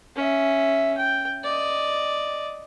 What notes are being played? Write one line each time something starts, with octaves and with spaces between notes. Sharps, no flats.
C#4 E5
G5
D5 D#5